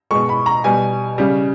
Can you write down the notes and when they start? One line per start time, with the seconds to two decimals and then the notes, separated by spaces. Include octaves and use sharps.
0.11 B2 G#3 C#6
0.29 B5
0.46 A#5
0.64 B2 G3 G#5
1.18 C#3 G3